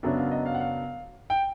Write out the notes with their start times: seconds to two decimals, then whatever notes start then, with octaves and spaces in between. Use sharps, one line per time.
0.03 F#2 C#3 F#3 B3 D4 E5
0.17 F5
0.31 D#5
0.46 F5
0.55 F#5
0.60 F5
1.30 G5